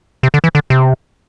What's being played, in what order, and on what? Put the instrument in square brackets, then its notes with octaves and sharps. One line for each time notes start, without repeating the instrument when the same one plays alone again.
[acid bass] C3
D3
E3
D3
C3